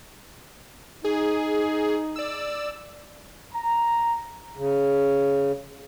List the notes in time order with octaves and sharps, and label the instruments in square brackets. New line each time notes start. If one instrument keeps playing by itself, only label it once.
[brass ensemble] D#4 [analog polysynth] G#4
[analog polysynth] D5 E6
[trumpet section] A#5
[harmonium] C#3